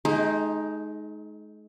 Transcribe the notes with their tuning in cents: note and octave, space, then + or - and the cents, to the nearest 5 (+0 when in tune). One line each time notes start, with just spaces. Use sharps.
G#3 +40 D#4 +5 G4 +45